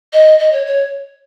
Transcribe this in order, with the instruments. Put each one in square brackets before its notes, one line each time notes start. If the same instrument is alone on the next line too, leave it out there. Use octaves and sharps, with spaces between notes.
[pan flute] D#5
D#5
C#5
C#5